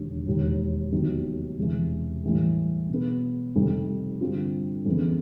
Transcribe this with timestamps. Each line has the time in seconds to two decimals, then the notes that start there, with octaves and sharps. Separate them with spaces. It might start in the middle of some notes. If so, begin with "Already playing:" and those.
Already playing: E1 D#2 D3
0.26 E1 D#2 D#3
0.92 F1 D#2 D#3 F#3 B3
1.58 E1 E2 C3 E3
2.23 A2 E3 G3
2.89 B2 G#3 B3
3.55 F1 F2 C3 D#3 G3
4.21 G2 D3 G3 C4 F4
4.85 F2 C#3 E3 G#3 B3